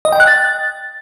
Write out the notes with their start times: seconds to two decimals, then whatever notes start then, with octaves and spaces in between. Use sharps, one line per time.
0.05 D#5
0.12 G5
0.20 F#6
0.27 A6